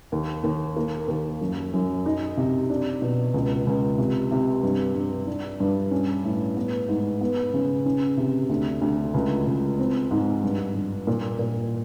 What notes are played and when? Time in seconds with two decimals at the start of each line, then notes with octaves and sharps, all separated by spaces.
0.12 D#2
0.44 D#2
0.76 A#3
1.08 D#2
1.41 F#2
1.73 F#2
2.06 D#4
2.37 C3
2.70 D4
3.02 B2
3.34 C#2
3.67 C#2
3.98 C3
4.31 C3
4.63 G2
4.95 G2
5.27 D4
5.60 G2
5.91 C#4
6.24 A2
6.57 B3
6.89 G#2
7.21 B3
7.54 C#3
7.86 C#4
8.17 C3
8.49 D2
8.81 D2
9.14 C#2
9.47 C#2
9.79 C4
10.11 G#2
10.43 G2
10.75 G2
11.07 A#2
11.39 A#2